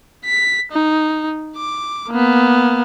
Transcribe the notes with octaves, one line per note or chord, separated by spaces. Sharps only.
B6
D#4
D6
A#3 B3